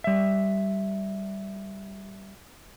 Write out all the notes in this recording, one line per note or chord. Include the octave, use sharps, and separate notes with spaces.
G3 E5